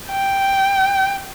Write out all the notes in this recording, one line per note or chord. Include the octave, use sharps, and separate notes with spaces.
G5